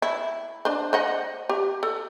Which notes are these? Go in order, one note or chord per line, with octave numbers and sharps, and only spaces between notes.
E4
D4 C5
C5 D#5 F#5
G4
A4